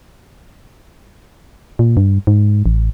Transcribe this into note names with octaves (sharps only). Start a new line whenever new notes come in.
A#2
G2
G#2
A1